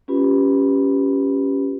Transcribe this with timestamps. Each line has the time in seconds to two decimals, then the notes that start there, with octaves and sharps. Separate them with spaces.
0.08 C#4 F4 G4 B4 B5